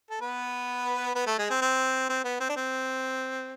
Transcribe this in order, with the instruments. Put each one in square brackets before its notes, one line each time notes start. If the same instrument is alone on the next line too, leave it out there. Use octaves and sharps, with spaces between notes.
[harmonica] A4
B3 B4
B3 B4
A3 A4
G#3 G#4
C4
C4
C4
B3
C4
D4
C4